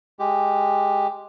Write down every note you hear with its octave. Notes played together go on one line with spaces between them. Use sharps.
G#3 G4